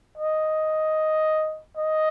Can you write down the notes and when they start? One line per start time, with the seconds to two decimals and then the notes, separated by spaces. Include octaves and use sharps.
0.18 D#5
1.77 D#5